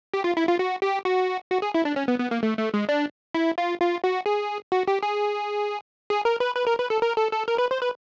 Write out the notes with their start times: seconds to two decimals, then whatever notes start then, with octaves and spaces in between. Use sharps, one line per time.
0.14 G4
0.24 F4
0.37 E4
0.48 F4
0.59 F#4
0.82 G4
1.05 F#4
1.50 F#4
1.62 G#4
1.74 E4
1.85 D4
1.96 C#4
2.08 B3
2.20 B3
2.31 A#3
2.43 A3
2.58 A3
2.74 G#3
2.89 D4
3.35 E4
3.58 F4
3.80 F4
4.04 F#4
4.26 G#4
4.72 F#4
4.87 G4
5.03 G#4
6.10 G#4
6.25 A#4
6.40 B4
6.56 B4
6.67 A#4
6.79 B4
6.90 A4
7.02 A#4
7.17 A4
7.32 A4
7.48 A#4
7.58 B4
7.71 C5
7.82 B4